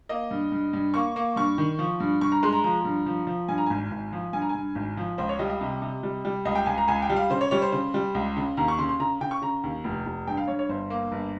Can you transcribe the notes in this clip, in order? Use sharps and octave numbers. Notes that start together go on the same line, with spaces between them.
A#3 D#5
G2
G2
G2
A#3 C#6
A#3
G2 C#6
D#3
F3
G2
G2 C#6
A#5
G#3 C6
A#5
F3 A#5
G2
F3
F3
G2 G#5
A#5
G#1 G#5
G#1
F3
G2 G#5
A#5
G#5
G2
G#1
F3
C#2 C5
C#5
G3 D#5
D#5
C3
C3
G3
G3
C#2 D#5
G5
C#2 G#5
A#5
C#2 G#5
G5
G3
F5
C#3 C5
C#5
G3 C#5
C5
C#3 C5
G3
C#2
C#3
D#2 A#5
C#6
C#3 C6
C6
C#3 A#5
C#3 G5
C#6
C#3 A#5
D#2
F1
F1
G2 G5
F5
G2 C#5
C#5
G1 C5
A#3
G1